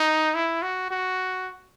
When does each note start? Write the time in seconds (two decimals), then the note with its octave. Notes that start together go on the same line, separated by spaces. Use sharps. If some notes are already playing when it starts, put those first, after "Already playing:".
Already playing: D#4
0.35 E4
0.62 F#4
0.91 F#4